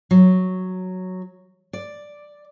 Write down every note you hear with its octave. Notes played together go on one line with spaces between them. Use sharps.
F#3
D5